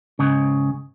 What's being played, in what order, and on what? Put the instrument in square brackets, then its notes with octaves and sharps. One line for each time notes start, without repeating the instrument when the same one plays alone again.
[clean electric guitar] C#2 G#2 C#3